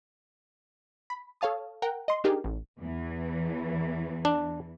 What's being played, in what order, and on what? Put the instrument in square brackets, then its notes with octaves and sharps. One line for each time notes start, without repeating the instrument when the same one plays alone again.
[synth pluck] B5
A4 C#5 F5 A5 D#6
A#4 F#5 G5 A#5
D#5 C6
D4 D#4 G4 G#4 A#4
A1
[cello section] E2 E3
[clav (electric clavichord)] D4